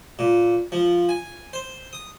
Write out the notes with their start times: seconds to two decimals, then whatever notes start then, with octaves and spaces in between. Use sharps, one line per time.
0.19 A#2
0.72 F3
1.09 G#5
1.53 C5
1.93 D#6